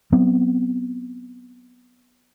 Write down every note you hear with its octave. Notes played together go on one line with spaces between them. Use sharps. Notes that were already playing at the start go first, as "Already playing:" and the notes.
F#3 B3 C4